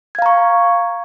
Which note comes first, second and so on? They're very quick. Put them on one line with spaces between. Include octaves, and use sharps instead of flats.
G#6 F5 A#5 C#6